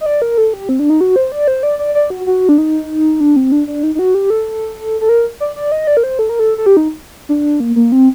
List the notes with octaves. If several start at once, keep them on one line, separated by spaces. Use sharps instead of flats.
D#5
D5
A#4
A4
G4
C4
D4
D#4
F#4
C5
D5
C5
D5
D5
D5
F#4
F#4
D4
D#4
D4
C4
D4
D4
D#4
D#4
F#4
G4
A4
A4
A#4
D5
D5
D#5
D5
A#4
C5
A4
A#4
A4
A4
G4
D#4
D4
A#3
A#3
C4